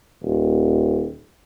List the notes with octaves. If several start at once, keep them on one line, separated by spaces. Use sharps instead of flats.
D#1